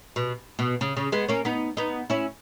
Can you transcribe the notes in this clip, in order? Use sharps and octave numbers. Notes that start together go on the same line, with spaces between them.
B2
B2
C#3
C#3
G#3 B3
A#3 C#4
B3 D#4
B3 D#4
C#4 E4